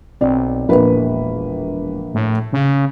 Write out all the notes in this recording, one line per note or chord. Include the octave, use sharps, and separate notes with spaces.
B1 C4 D5
E1 A#1 A#3 B4
A2
C#3